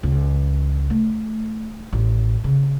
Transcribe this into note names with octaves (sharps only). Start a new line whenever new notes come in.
C#2
A3
A1
C#3